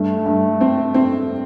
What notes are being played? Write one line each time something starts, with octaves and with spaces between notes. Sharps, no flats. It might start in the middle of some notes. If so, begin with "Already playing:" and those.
Already playing: G2 A3
G2
C4
C4